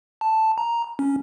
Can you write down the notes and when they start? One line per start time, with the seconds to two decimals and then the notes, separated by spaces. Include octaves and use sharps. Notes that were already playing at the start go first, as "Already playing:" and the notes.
0.21 A5
0.58 A#5
0.99 C#4